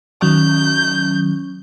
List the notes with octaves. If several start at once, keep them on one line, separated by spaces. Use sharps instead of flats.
D#3 F#3 C#4 G6